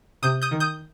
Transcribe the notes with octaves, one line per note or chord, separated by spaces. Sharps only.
C3 D#6 G6
D#6 G6
D#3
D#6 G6